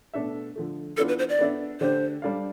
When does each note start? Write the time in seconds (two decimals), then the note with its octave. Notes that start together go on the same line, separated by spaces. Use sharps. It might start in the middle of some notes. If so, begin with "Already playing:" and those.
0.13 B2 A3 D4 A4 E5
0.56 D3 F3 A3
0.97 E3 B3 D4 F4 A4
1.08 B4
1.19 C5
1.29 D5
1.39 B3 D4 A4 E5
1.81 D3 A3 D4 G4 C5
2.22 G3 D4 A4 D5 F5